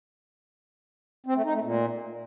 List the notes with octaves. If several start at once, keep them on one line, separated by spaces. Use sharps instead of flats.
C4
A3
D#4
A3
A#2